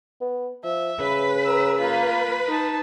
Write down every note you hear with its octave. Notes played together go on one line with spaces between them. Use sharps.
B3
F3 E5
C#3 B4
A#5 E6
A#3 F4 B4
D#4 A5